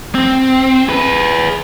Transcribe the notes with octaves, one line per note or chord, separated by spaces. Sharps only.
C4
G#4 B4